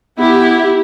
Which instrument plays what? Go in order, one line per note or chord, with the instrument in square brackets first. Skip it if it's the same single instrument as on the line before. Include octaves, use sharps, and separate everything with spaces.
[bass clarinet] B3 [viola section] E4 G4